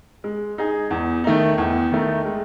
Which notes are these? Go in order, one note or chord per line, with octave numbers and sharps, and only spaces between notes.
G#3
D#4 G#4
E2
D#3 A3 D#4
E2
D#3 A3 D#4
G#3